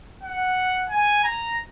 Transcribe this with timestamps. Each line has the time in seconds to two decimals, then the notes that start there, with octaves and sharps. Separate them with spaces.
0.23 F#5
0.90 G#5
1.24 A#5